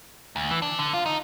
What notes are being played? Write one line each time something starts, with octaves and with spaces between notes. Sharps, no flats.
D2
E3
D4
D3
F4
D#4